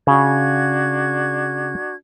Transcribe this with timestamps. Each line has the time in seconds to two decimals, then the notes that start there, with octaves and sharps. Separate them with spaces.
0.07 C#3 D4 F#4 G#6